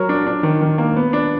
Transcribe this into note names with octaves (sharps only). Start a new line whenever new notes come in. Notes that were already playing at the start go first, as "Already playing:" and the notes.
Already playing: F#3 F#4 A#4
D4
D4
D#3
D#3
A#3
B3
D4